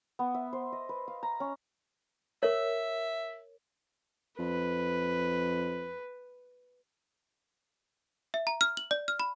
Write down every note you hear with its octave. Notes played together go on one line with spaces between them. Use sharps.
B3
E5
C5
D#5
B4
F5
A#5
C#4
A#4 C#5 E5
F2 B4
E5
A#5
F6
F#7
D5
F6
B5